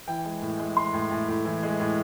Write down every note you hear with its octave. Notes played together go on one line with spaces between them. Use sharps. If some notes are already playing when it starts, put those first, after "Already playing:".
E3 G5
G#3
A2
G#3
G#3 C6
A2
A2
A2
E3
G#3
A2